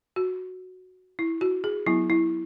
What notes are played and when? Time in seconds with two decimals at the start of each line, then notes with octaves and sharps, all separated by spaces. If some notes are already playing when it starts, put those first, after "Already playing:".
0.16 F#4
1.19 E4
1.41 F#4
1.64 G#4
1.86 F#3 B3 E4
2.10 E4